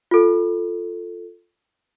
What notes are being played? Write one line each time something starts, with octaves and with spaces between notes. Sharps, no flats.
F4 A4